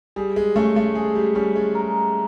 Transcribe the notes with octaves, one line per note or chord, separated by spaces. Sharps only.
G3 G#4
G#3
A3 C#4
A3
G#3 G#4
G3
G3 C#4
G#3
A#4